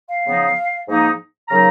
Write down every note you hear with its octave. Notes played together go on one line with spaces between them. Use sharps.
F5
C#3 F3 B3 D#4
G#2 F3 A#3 D#4
C#3 F#3 A#3 D#4 A#5